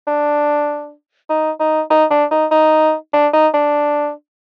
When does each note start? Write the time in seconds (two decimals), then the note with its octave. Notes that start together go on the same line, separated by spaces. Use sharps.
0.07 D4
1.30 D#4
1.60 D#4
1.90 D#4
2.11 D4
2.31 D#4
2.51 D#4
3.13 D4
3.33 D#4
3.54 D4